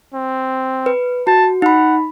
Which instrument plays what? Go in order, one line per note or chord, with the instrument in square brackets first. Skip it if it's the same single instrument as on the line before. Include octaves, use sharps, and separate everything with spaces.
[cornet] C4
[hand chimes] B4
[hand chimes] F#4 [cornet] A5
[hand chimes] D#4 B5 [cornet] F#5